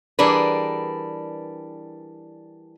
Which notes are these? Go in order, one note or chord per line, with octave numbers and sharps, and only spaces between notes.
E3 G3 D4 G#4 A#4 B4